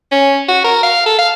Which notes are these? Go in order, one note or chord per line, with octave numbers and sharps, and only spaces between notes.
C#4
F#4
A#4
F5
A4
F5